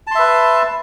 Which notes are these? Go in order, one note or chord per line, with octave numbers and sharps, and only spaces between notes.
B4 E5 A5 C6